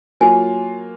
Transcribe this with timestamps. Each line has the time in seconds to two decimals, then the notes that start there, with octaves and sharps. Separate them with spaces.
0.20 F#3 A#3 F4 G#5